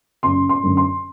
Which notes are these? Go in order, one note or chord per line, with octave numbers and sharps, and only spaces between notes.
F#1 C6
C6
F#2 D3
C6